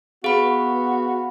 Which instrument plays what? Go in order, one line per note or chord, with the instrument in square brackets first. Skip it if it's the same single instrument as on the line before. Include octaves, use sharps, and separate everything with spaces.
[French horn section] B3 [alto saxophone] F#4 [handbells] G#4 [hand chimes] F5 B5